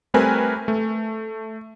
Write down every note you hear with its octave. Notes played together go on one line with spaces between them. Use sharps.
G3 A3 C4 A#4 B4 G#5
A3